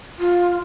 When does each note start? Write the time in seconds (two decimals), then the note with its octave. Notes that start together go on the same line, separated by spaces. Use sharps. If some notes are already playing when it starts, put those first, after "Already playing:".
0.19 F4